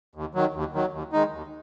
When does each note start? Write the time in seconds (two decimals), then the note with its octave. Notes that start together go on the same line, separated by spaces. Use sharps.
0.15 D#2
0.35 D#3 F#3
0.54 D#2
0.74 D#3 F#3
0.93 D#2
1.13 D#3 G#3 D#4
1.32 D#2